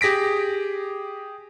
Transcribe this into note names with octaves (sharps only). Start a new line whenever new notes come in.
G4 G#4 A#6 B6 D7